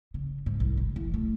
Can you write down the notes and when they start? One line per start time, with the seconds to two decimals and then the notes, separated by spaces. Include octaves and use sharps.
0.14 C#3
0.46 G#2
0.60 C2
0.77 G1
0.96 E3
1.14 A3